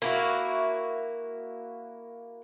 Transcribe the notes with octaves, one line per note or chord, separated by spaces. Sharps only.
A#3 E4 F#4